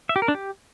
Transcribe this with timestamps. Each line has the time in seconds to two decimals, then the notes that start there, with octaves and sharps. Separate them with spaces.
0.09 E5
0.16 G4
0.22 A#4
0.28 D4
0.35 G4